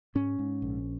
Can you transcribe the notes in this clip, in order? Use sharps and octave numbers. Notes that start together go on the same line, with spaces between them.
G#2 C#4
G#2
A#1